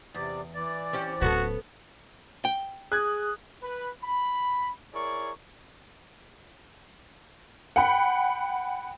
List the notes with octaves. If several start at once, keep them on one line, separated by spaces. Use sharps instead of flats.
E2 C3 D5
E3 D5
C4 C#4 G4
D1 B3 C#4 F#4 A4
G5
G#4 D#6 F#6 G#6
B4
B5
E4 G#4 A#4 C#5 D5 C#6
F#5 G5 B5